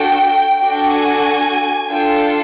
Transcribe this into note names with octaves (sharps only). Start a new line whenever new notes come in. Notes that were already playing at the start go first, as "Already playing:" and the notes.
Already playing: D4 F#4 A4 G5
D4 F#4 A4 G5
G#5
D4 F4 A4 G5